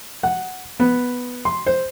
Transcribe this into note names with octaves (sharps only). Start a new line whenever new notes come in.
F#5
B3
C6
C5